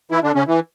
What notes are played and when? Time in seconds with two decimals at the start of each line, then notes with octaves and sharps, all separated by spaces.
0.11 E3 E4
0.23 D3 D4
0.35 C#3 C#4
0.47 E3